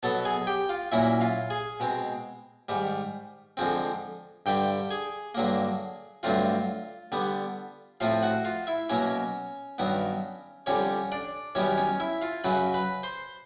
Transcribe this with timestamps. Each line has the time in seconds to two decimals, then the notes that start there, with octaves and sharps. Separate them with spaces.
0.03 B2 F#3 B3 A4 A5
0.25 G#4 G#5
0.47 G4 G5
0.69 F4 F5
0.92 A#2 F#3 A#3 C#4 E4 E5
1.21 F4 F5
1.50 G#4 G#5
1.80 B2 G#3 C4
2.69 G#2 D#3 G3
3.57 F2 D3 F3 G#3 C4
4.46 G2 D3 G3 G4 G5
4.90 G#4 G#5
5.35 G2 D3 F#3 A#3
6.23 G2 D3 F#3 A3 C4 F4 F5
7.12 D3 G3 B3
8.00 A2 F3 A3 C4 F4 F5
8.23 F#4 F#5
8.45 F4 F5
8.67 E4 E5
8.89 B2 F#3 A#3 C#4 C#5
9.78 G2 D#3 F#3 B3
10.66 F2 D3 G3 C#4 C#5
11.12 D4 D5
11.55 F#2 D#3 G3 B3 C#4 C#5
11.78 C#4 C#5
12.00 E4 E5
12.22 F4 F5
12.44 F#2 C#3 F#3 B4 B5
12.74 B4 B5
13.03 C5 C6